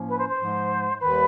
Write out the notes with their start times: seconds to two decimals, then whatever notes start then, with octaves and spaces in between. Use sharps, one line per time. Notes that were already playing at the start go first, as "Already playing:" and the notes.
Already playing: A2 F3 A#3 C#4
0.09 B4
0.19 C5
0.29 C5
0.40 G#2 F3 G#3
1.02 D#2 D#3 G3 B4